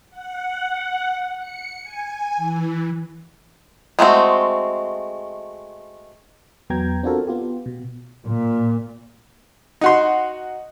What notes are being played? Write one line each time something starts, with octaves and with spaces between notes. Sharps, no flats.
F#5
C#7
G#5
E3
G#3 A3 C4 F#4
E2 F#3 B3 G5 A#5 G#6
C4 D4 F4 F#4 A4 A#4
B3 F4 G4
B2
A#2
D#4 F#4 C6